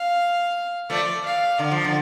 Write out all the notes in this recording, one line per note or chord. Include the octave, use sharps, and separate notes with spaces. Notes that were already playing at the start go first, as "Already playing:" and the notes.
Already playing: F5
F3 A3 D5
F5
D3 D5
F3
D3